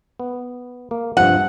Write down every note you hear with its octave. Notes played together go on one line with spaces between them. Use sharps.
B3
A#3
G2 C3 F3 F#5